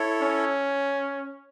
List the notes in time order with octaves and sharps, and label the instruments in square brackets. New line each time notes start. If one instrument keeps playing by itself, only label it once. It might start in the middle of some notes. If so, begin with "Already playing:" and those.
Already playing: [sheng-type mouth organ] E4 A4 C#5
[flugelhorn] C#4